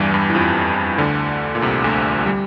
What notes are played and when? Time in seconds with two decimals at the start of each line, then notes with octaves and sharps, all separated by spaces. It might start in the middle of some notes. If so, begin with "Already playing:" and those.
Already playing: E2 G2 E3 G3
0.14 G2 G3
0.30 E3
0.35 F2 F3
0.98 D2 D3
1.55 A#2
1.62 C2 C3
1.84 D2 D3
2.26 G3